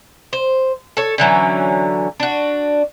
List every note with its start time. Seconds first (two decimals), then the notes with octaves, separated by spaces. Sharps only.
0.33 C5
0.97 A4 C#5
1.18 D3 E3 F#3 C#4
2.20 D4 F#4